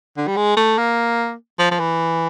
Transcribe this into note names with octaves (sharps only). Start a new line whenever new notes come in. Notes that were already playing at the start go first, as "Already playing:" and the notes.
D3
G3
G#3
A3
A#3
F3
F3
E3